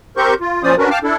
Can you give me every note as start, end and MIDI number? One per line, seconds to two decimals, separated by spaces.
0.17 0.34 60
0.17 0.34 67
0.17 0.34 70
0.17 0.34 72
0.17 0.34 85
0.17 0.34 91
0.41 0.62 65
0.63 0.75 46
0.63 0.75 53
0.63 0.75 61
0.63 0.75 72
0.63 0.75 74
0.63 0.75 87
0.78 0.89 61
0.78 0.89 62
0.78 0.89 66
0.78 0.89 70
0.78 0.89 71
0.91 0.99 77
0.91 0.99 79
0.91 0.99 81
0.91 0.99 86
0.91 0.99 89
1.04 1.16 62
1.04 1.16 64
1.04 1.16 69